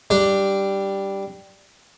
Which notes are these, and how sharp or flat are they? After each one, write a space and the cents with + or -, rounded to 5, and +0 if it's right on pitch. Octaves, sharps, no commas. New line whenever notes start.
G3 +0 D4 +0